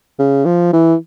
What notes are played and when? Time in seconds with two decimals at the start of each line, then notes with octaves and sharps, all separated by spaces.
0.19 C#3
0.45 F3
0.73 E3